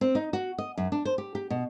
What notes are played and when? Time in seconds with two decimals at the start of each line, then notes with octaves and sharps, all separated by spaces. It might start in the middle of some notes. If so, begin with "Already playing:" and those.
0.01 C4
0.15 D#4
0.33 F#4
0.58 D#5
0.78 F#2
0.92 D4
1.05 C5
1.18 G4
1.35 G4
1.50 B2